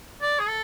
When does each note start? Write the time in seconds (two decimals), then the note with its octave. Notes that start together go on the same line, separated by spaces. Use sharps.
0.22 D5
0.39 G#4
0.48 A4